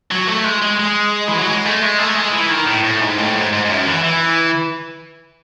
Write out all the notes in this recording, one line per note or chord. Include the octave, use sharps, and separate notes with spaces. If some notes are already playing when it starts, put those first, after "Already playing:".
F#3
A3
G#3
G#3
G#3
E3
F#3
G#3
A3
G#3
A3
G#3
E3
D#3
A2
A2
G#2
A2
G#2
G#2
G#2
F#2
E3
E3